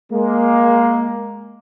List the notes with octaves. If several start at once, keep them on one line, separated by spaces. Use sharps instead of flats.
G#3 A#3